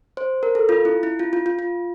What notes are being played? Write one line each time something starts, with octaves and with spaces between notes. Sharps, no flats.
C5
A#4
A4
F4
E4
E4
F4
F4
F4
F4